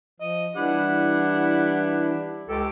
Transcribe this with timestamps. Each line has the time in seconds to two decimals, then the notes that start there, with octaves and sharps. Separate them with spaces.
0.20 F3 D#5
0.56 E3 G3 D4 E4 G4 F#5
2.49 C#2 G#3 G4 A4